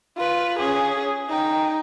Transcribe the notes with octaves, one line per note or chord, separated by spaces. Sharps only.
F4 B4
C#4 G#4
D#4 G5